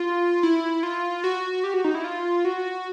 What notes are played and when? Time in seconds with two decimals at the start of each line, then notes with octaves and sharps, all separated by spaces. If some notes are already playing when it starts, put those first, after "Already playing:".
Already playing: F4
0.43 E4
0.83 F4
1.24 F#4
1.64 G4
1.74 F#4
1.84 D#4
1.95 E4
2.04 F4
2.45 F#4